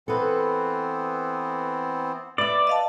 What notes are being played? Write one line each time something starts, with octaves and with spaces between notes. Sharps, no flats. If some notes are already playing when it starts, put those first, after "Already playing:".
E3 B3 C4 A4 B4
B4 D5 E5
D#5 F5 A5